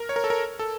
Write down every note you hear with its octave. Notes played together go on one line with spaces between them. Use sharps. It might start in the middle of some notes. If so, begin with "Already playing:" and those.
Already playing: A#4
C#5
A#4
A4
A#4
A4